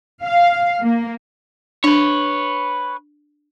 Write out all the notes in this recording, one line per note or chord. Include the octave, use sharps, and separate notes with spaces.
F5
A#3
D4 B4 C#5